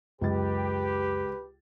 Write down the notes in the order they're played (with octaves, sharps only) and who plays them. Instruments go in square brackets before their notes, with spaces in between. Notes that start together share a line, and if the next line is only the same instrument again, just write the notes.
[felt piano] C#2 D#5 A6 [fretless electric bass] F#2 F#3 [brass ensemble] G4 [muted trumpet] B4